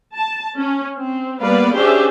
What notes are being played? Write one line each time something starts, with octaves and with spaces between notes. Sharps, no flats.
A5
C#4
C4
G3 A#3 B3 B4 D5 F5
C#4 D4 G4 G#4 C5 E5